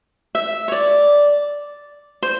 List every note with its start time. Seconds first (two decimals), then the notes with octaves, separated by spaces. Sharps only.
0.35 E5
0.68 C#5
0.72 D5
2.22 C5